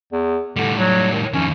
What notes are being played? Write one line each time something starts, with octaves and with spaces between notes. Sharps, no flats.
E2
A2 D3 G3
F#3
D#3
F2 D#3 C#4